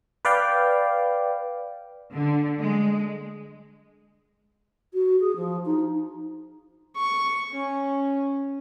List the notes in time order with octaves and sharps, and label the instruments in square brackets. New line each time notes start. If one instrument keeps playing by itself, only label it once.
[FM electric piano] B4 D5 F5 G5
[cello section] D3
G#3
[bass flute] F#4
G#4
F3
D#4
[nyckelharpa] C#6
C#4